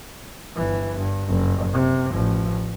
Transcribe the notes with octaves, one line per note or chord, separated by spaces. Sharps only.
G1 E3
G2
F#1
C3
A1 F3